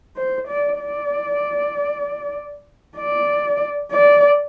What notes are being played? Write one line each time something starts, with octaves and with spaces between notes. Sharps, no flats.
C5
D5
D5
D5
D5